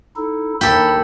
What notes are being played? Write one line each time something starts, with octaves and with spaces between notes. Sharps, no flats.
D#4 E4 A4
D#2 A#3 G4 A4 B5